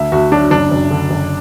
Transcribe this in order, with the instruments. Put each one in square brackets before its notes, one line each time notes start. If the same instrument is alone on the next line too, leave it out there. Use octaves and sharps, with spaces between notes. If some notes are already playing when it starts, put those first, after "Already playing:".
Already playing: [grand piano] D2 E5
D2 F#4
F#3 D4
F#1 D4
F#1
D3
F#1